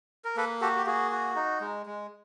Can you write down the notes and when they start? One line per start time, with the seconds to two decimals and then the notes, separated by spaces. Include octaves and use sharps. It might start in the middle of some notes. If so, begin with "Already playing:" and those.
0.25 A#4
0.37 A#3 A4 B4
0.61 F#4 G4 A4
0.77 G4
0.86 A#3 F#4 G#4
1.11 F#4
1.36 D#4
1.60 G#3
1.86 G#3